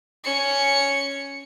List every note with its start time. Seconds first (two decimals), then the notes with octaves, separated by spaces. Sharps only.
0.24 C#4 C#7